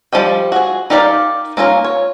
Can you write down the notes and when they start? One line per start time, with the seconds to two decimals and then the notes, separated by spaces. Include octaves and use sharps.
0.12 F3 G3 D#5 G5
0.52 F#4 G#4
0.90 D#4 G4 A#4 D5 F5
1.57 A#3 C#4 F4 A#4
1.85 C#5